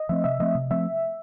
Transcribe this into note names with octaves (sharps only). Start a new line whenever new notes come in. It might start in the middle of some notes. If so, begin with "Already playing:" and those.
Already playing: D#5
F3 A3 C4 E5
C3 E5
F3 A3 C4 D#5
C3
F3 A3 C4 E5